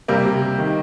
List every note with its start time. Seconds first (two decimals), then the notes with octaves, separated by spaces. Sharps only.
0.08 C3 G3 A#3
0.25 C3
0.42 C3
0.59 D#3